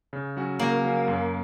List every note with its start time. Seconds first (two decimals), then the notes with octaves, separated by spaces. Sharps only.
0.13 C#3
0.36 F#3 C#4 F#4
0.59 C#3 A#3
0.84 F#3 C#4 F#4
1.08 F#2